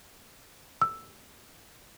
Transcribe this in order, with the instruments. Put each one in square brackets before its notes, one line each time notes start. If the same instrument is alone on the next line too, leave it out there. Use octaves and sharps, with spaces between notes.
[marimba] E6